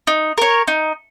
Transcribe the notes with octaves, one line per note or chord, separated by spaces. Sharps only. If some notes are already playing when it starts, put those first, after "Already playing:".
D#4
A#4 C#5
D#4